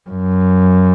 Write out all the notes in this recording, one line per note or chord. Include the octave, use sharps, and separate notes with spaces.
F#2